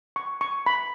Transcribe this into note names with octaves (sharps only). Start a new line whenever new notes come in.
C#6
C#6
B5